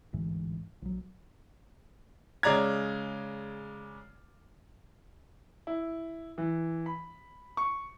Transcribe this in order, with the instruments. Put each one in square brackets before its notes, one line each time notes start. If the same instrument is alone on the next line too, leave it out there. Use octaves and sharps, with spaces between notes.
[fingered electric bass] A1 D2 G#2 E3
A#1 F#3
[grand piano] C#3 G#3 D5 A#5 G#6
E4
E3
B5
C#6